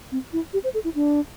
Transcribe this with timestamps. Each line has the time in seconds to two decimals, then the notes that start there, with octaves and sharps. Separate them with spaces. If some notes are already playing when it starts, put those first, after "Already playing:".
0.12 C4
0.33 E4
0.53 G4
0.64 C5
0.74 A4
0.84 E4
0.95 D4